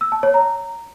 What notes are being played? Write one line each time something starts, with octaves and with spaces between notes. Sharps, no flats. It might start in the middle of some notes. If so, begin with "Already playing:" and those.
E6
A5
C#5
A#5